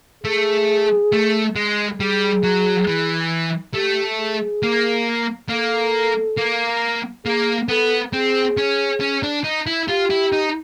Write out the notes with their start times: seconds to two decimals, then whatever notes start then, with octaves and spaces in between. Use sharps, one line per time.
0.24 A3 G#4
1.12 A3
1.55 G#3
2.00 G3 G#4
2.43 F#3
2.88 E3
3.74 A3 G4
4.19 G#4
4.63 A#3
5.50 A#3 A4
6.37 A#3
7.26 A#3 G#4
7.69 B3 A4
8.13 C4 G#4
8.57 C#4
9.01 C#4
9.23 D4
9.44 D#4
9.66 E4
9.88 F4 G4
10.11 E4
10.32 D#4